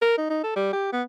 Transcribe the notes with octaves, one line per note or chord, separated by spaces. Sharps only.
A#4
D#4
D#4
A4
G3
G4
B3